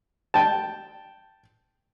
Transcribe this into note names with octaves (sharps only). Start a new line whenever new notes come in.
G5 A5